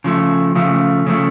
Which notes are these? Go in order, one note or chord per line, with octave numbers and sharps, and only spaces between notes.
C#3 F3 A3
C#3 F3 A3
C#3 F3 A3